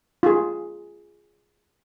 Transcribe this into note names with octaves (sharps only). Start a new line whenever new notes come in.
F4 G#4